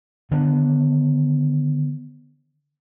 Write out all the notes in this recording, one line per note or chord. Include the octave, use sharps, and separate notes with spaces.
D3 D#3 B3 D4